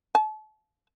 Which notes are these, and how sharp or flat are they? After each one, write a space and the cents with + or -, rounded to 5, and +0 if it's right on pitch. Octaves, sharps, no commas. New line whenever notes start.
A5 -35